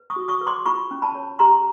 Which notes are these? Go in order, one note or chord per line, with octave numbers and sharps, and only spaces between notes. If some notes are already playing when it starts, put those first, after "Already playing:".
Already playing: B4
C#6 D#6
F#4
C#6 D#6
B4
C6 D6
F4 B5 C#6
C#4
A5 B5
C#5
G4 A#5 C6